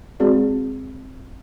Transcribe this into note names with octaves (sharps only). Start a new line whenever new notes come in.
G#3 C4 F#4 G#4 D5